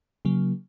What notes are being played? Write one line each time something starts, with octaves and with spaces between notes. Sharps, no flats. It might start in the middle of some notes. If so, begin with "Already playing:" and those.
C#3 F#3 A#3